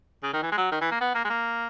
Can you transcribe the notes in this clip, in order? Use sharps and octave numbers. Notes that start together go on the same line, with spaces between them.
C#3
D#3
E3
G#3
F#3
D#3
E3
A#3
B3
A#3
G#3
A#3